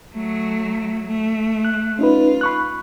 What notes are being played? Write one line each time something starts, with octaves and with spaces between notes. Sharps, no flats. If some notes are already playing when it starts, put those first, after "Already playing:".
F#3 A3
A3
F#6
C#4 D#4 F4 B4
B5 C#6 F#6